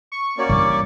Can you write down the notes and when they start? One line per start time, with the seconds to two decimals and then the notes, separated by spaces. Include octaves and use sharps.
0.12 C#6
0.38 A#3 C#4 F#4 C#5 D5
0.49 G2 E3 D6